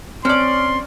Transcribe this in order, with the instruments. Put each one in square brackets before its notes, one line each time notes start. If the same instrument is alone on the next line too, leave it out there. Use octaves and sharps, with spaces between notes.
[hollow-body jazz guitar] C4 [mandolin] C#4 D5 [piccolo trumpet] C6